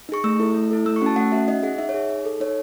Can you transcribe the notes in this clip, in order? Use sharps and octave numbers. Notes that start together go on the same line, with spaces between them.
D#4 G#4 C#6
A3 E6
E4 A4
A3
E4 A4
A3 E6
C#6
C#4 F#4 A5
A3 F#5
C#4 F#4 E5
D#4 D#5
G#4 F#5
D#4 E5
C#5
G#4
D#4
A4
D#4 C#5